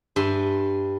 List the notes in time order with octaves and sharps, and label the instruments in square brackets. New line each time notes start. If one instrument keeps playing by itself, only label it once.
[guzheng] G2 E5 G#5 C6